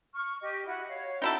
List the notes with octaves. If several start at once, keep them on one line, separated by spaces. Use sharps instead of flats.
C#6 F6
G4 D#5
E4 F#4
C#5 F5
D#4 E4 F#4 A4 G5